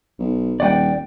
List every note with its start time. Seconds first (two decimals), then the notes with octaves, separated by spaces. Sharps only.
0.19 B1
0.60 D#1 D5 F#5 G5